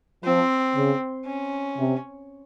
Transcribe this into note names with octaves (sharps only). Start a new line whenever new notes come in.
F3 C4
C#3
C#4
C3